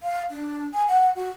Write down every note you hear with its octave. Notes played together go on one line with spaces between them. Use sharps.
F5
D4
G#5
F#5
F#4